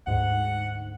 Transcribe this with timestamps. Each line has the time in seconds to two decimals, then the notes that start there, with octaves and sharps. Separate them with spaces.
0.07 D2 G#2 F#5